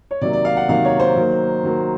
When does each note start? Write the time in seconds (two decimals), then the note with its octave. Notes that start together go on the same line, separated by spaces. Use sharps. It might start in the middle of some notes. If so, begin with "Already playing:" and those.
0.11 C#5
0.21 C3 D#3 F#3 A#3 D5
0.33 D5
0.45 F5
0.57 F#5
0.69 C3 D#3 F#3 A#3 F5
0.85 C#5
1.00 C5
1.16 D#3 F#3 A#3
1.63 D#3 F#3 A#3